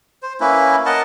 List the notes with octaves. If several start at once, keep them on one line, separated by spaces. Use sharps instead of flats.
C5
A#3 C#4 E4 B4
A#4 D#5 F#5 A5